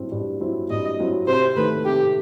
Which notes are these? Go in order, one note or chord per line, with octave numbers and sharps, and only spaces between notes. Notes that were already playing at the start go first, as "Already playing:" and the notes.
Already playing: G2 F#3 C4 E4
G2
F#3 C4 E4
G2 D#5
F#3 C4 E4
C3 C5
D#3 A3 B4
C3 G4